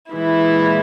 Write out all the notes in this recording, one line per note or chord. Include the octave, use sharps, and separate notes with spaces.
A#2 E3 G#3 E4